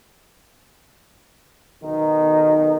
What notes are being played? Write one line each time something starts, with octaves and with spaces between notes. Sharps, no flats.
B1 D#3 D#4